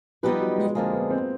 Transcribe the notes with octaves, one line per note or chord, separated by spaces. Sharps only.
F3 G3 B3 D#4 G4 B4
F#3
G#3
F2 D3 F3 G#3 A#3
B3
C4